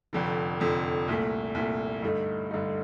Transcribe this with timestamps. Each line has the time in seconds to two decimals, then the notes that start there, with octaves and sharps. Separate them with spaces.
0.13 F1 F2 D3
0.60 F1 F2 D3
1.08 C2 A#2 A3
1.55 C2 A#2 A3
2.03 G2 D3 A3 D#4
2.51 G2 D3 A3 D#4